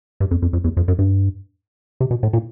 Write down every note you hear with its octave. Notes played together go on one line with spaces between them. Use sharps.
G2
F2
F2
F2
E2
F2
F#2
G2
C3
B2
A2
A#2